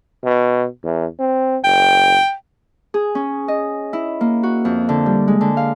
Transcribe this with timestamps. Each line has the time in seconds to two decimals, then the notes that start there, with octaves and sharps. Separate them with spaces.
0.24 B2
0.84 E2
1.19 C4
1.64 F#1 G5
2.94 G#4
3.15 C#4
3.48 D#5
3.93 E4
4.21 A#3
4.43 F#4
4.65 F2
4.89 D3
5.06 G3
5.27 G#3
5.41 D3
5.57 F5